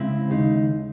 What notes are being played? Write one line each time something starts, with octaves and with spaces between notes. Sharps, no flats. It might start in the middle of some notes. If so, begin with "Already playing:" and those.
Already playing: C#3 G#3 C4 E4
D#2 C#3 G#3 D#4